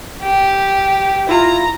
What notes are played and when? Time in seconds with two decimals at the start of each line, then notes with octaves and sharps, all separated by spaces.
0.22 G4
1.29 E4 F4 A#5